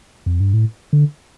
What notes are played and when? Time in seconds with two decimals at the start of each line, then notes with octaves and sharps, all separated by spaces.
0.26 F2
0.40 G2
0.53 A2
0.93 D3